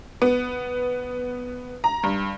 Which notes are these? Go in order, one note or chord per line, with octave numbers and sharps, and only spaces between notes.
B3
A#5
G2